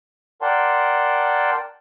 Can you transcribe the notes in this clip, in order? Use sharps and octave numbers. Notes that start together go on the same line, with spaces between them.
A#4 D5 F#5 G5 A5 C6